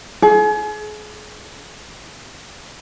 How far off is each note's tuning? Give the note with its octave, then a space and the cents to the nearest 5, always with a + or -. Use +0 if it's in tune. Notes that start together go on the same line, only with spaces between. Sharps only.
G#4 +35